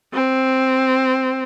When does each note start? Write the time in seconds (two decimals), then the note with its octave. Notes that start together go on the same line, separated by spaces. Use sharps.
0.13 C4